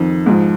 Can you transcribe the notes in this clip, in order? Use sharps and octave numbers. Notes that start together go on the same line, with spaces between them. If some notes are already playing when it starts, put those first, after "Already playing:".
Already playing: F2 D#3
G#2 F3